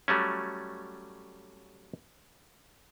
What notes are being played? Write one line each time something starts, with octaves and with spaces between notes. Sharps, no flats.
F#3 G3 A3 C#4